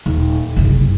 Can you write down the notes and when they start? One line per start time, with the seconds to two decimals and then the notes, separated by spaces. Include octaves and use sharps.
0.06 D#1
0.56 F#1 C2